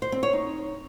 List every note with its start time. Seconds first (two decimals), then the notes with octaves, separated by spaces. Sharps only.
0.02 C5
0.12 C4
0.23 C#5
0.33 D#4